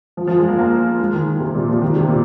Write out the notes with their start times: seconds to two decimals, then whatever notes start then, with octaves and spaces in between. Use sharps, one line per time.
0.17 F3
0.27 F3
0.38 G#3
0.48 A#3
0.59 A#3
0.99 G#3
1.13 D#3
1.27 D#3
1.40 C3
1.55 A#2
1.68 F3
1.82 D#3
1.96 C3
2.09 A#2